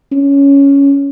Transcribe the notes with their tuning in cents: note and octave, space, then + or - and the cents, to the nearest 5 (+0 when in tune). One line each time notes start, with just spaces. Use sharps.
C#4 +10